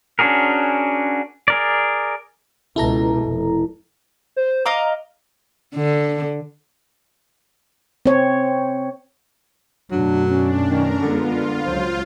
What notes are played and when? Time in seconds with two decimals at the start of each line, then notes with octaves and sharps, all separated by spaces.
0.19 C#4 D4 F#4 G#4 A#4
1.48 G#4 A#4 D5
2.76 C#2 B2 E4 A4 A#5
3.25 F1
4.36 C5
4.65 D#5 F5 A#5 D6
5.76 D3
8.06 C4 C#5
9.91 F#2 B2 F#3 A3 D4
10.29 C#4 D4
10.70 F2 D#3 A#4 A#5
11.02 D3 G#3 B3 F4
11.32 D3
11.64 C#2 F#3 C5